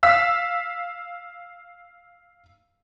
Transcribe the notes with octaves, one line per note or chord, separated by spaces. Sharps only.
F5 E6 B6